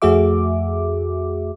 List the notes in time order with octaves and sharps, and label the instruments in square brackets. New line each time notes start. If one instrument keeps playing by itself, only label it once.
[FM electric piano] F2 A3 F#4 G#4 E5 D6